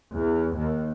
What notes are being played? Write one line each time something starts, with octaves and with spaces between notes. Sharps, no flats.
E2
D#2